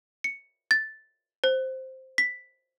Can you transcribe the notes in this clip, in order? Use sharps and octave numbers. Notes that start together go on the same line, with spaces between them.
C#7
A6
C5
B6